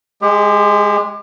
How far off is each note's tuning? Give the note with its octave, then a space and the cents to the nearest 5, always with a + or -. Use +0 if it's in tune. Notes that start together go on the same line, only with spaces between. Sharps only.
G#3 +0 G4 +35